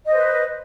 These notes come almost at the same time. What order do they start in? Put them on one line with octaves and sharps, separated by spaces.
D#5 C5 B4